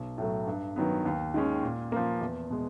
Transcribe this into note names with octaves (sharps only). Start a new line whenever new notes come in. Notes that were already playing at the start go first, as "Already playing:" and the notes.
Already playing: B1
A2 F#3 A3
G2
D#3 F#3 B3
D#2
D#3 G#3 C#4
A#2
F3 A#3
E2
B2 G#3